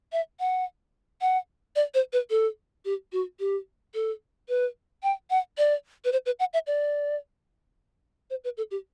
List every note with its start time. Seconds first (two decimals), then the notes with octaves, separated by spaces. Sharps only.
0.12 E5
0.40 F#5
1.21 F#5
1.76 D5
1.94 C5
2.13 B4
2.30 A4
2.85 G4
3.12 F#4
3.40 G4
3.94 A4
4.49 B4
5.03 G5
5.30 F#5
5.58 D5
6.05 B4
6.12 C5
6.26 B4
6.39 F#5
6.53 E5
6.67 D5
8.30 C5
8.44 B4
8.57 A4
8.71 G4